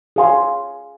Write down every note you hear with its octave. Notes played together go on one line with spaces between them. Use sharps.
G#4 F5 G#5 C6